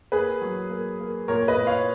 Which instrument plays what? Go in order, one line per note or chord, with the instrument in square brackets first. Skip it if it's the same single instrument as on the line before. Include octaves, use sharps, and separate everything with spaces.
[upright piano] A#3 G#4 B4
F#3
A#3
A#3
A#2 A#4 C#5
B4 D#5
A#2
C#5 F5